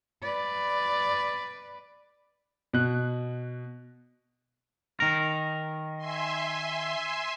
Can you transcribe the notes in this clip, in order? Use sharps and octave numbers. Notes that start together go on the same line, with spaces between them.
B4 D5
B2 F#6
D#3 A#4
E5 G#5 C6